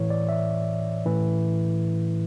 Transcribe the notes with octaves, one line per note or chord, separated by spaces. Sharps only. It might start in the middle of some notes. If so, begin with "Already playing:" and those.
Already playing: A2 E3 C#5
D5
E5
A2 E3